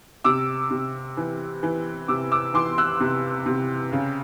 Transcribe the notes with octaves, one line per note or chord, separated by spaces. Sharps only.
C3 D6 E6
C3
E3
E3
C3 D6 E6
D6 E6
E3 C6 D6
E6 F#6
C3
C3
C#3